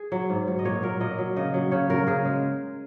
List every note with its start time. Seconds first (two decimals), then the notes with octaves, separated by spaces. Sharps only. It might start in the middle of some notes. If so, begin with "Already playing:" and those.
Already playing: G#4
0.12 F#3
0.30 G#2
0.47 F#3
0.59 D#5
0.65 A#2 C#5
0.82 F#3 A#4
1.00 A#2 D#5
1.18 F#3
1.36 C#3 D#5
1.54 F#3
1.71 C#3 C#5
1.90 F#3 A#4
2.07 C#3 G#4
2.25 G#3